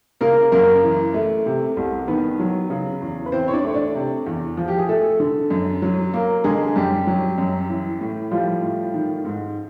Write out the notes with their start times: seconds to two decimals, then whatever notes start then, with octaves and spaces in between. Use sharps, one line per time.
0.21 C#3 A#3 A#4
0.52 F#2 A#3 A#4
0.83 E3
1.14 A3
1.46 C3
1.77 C2
2.08 D#3 B3 B4
2.39 F#3
2.70 C#3
3.01 E2
3.26 B4
3.32 E3 C4 C5
3.48 C#5
3.53 D4 D5
3.64 A3 C#5
3.74 D4 D5
3.95 C3
4.26 E2
4.57 F3
4.68 G4
4.78 G#4
4.89 A3 A4
5.20 D3
5.50 F#2
5.82 F#3
6.14 A#3
6.44 D3 G#3 G#4
6.76 F#2 G3 G4
7.07 F#3
7.38 F#2
7.69 E3
8.01 A2
8.31 F3 G3 F4
8.62 A2
8.94 D#3
9.25 G#2